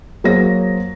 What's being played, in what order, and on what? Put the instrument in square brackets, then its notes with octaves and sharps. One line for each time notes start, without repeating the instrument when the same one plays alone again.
[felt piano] F#3 A#3 G#4 C5 C#5 A#6